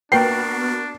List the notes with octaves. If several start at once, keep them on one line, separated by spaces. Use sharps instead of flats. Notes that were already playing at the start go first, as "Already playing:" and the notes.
A#3 B3 D4 F#4 A#4 B4 G5 C7